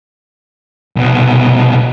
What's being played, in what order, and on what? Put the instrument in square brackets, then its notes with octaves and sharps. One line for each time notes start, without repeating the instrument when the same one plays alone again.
[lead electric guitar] C2 B2